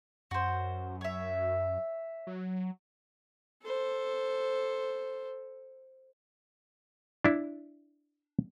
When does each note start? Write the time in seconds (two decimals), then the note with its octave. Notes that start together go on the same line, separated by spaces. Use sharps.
0.31 F#2 F#4 C5
1.01 C#5 E5
2.27 F#3
3.63 A4 C5
7.24 D4 E4